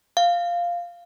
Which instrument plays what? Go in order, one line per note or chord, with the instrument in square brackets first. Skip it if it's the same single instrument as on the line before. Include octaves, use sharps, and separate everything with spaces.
[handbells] F5